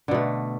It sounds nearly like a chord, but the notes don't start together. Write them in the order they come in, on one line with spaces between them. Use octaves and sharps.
D3 B2 A3